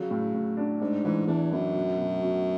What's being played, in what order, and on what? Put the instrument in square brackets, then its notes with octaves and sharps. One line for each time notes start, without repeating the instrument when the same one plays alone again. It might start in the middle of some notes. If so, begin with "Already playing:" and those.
Already playing: [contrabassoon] C#3 [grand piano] F#3
[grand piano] A2
A2
D4
[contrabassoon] G#2 [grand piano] D4
[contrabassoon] G#2 [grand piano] E3
[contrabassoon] E2 [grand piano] D4
[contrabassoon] F#2 [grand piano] B3
[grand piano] B2
B2
B2